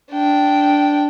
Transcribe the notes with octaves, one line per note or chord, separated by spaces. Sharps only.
D4 G5